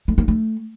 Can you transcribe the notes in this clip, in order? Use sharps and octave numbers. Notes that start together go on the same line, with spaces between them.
A3
A#3
A3